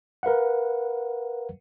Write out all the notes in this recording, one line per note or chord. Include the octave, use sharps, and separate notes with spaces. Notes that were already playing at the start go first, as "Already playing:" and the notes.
A#4 B4 F5 F#5